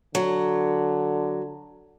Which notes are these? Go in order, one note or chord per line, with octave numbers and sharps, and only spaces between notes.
D3 F#3